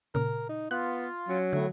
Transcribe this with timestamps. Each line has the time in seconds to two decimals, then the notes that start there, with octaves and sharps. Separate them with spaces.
0.15 A#2 C#3 A#4
0.49 D#4
0.71 B3 F4 F#6
1.29 F#3 C#4
1.53 A2 D3 A3